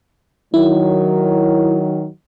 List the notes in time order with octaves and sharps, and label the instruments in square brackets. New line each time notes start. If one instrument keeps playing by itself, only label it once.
[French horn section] D#3 F#3 [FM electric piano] E4